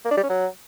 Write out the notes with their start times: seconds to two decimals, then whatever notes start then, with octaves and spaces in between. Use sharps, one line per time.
0.05 A#3
0.11 D4
0.17 G3
0.23 C#4
0.29 F#3